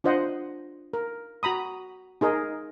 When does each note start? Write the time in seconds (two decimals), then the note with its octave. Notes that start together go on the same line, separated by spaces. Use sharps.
0.04 D4 F4 C5 D#5 F#5
0.93 A#4
1.43 F#4 A#5 B5 D#6
2.21 D#4 G#4 A#4 D#5